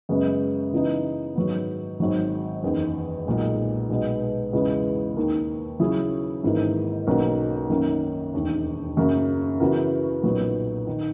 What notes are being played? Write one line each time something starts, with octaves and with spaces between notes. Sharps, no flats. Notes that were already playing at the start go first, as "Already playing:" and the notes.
F#2 C#3 G#3 B3
C#3 E3 B3 D#4
G#2 D#3 F#3 B3
G#1 G#2 F#3
F#1 E2 D#3
B1 A#2 G#3
B1 B2 G#3 B3
E2 C#3 E3 G#3 B3
D#2 D#3 A#3
C#3 F#3 C#4 E4 G#4
G#1 G#2 E3 A#3
B1 B2 A#3 C#4 F#4
F#2 D#3 A#3 C#4
E1 D#2 D#3
F#2 C#3 F#3 A#3
C#3 E3 B3 F#4 A#4
B1 A#2 F#3 B3
D#3